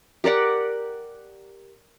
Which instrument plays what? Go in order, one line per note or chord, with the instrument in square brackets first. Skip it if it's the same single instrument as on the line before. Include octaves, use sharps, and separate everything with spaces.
[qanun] G4 A#4 D5 F#5